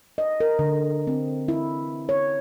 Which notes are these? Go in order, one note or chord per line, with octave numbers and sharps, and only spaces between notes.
D#5
A#4
D3
C4
E4
C#5